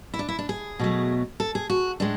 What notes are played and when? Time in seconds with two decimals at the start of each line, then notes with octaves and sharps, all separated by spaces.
0.14 E4
0.19 D4
0.28 E4
0.39 D4
0.49 G#4
0.79 B2 F#3 A3
1.40 A4
1.55 G#4
1.70 F#4
2.00 A2 G#3 D4